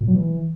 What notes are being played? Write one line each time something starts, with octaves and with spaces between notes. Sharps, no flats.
A#2
F#3
E3